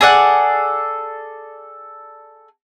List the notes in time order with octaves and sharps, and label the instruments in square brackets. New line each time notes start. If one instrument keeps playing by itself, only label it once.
[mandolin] G#4 A4 D5 F#5